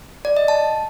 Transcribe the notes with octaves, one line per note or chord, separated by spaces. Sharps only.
D5
D#5
A5